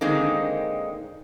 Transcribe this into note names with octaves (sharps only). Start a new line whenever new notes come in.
D3 D#3 G#3 A#3 C4 D#4